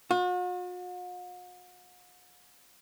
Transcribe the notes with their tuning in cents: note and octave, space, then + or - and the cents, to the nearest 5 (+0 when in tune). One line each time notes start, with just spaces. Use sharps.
F#4 -45